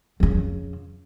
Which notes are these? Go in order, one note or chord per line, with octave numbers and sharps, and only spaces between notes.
F2 C#3